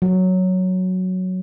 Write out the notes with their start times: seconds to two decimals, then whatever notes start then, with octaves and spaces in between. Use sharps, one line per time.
0.02 F#3